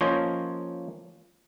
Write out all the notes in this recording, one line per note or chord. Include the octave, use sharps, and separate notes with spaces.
F3 A#3 C#4 C5 C#5 D#5